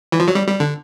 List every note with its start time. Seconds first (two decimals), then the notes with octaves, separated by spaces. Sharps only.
0.12 E3
0.19 F3
0.28 F#3
0.35 G3
0.48 G3
0.60 D3